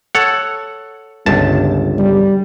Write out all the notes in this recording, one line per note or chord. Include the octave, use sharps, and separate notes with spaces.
A4 C#5 F#5
G1 C#2 A5
G3